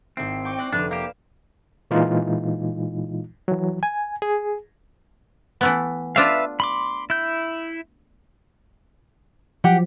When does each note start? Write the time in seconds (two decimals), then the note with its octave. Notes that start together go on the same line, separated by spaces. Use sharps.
0.17 G#1 C4 E4
0.45 G5 C#6 D6
0.58 D5 F#6 A#6
0.73 F1 D3 D4 B4
0.91 A#3 G4 F5 E7
1.91 A#2 E3 G#3 D#4 F4
3.48 E3 F#3
3.83 G#5
4.22 G#4
5.61 E3 A3 B3
6.16 A3 D4 F4 B4 E5 F5
6.60 B5 C6 D6
7.10 E4 G6
9.64 F3 F#3 G4 F#5 G5